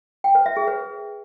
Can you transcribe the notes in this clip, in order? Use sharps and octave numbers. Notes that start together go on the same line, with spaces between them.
G5
B4
E5
G#4
B4